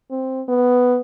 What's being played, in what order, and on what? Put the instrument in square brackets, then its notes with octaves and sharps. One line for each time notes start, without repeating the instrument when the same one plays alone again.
[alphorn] C4
B3